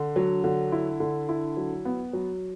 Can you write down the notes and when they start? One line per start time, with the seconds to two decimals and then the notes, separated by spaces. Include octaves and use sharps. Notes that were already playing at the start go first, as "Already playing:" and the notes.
Already playing: D3
0.16 F#3
0.44 D3
0.72 E4
1.00 D3
1.29 E4
1.57 F#3
1.85 B3
2.13 F#3